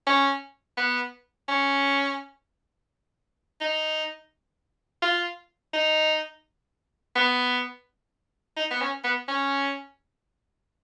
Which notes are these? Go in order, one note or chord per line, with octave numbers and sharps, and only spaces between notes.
C#4
B3
C#4
D#4
F4
D#4
B3
D#4
B3
C#4
B3
C#4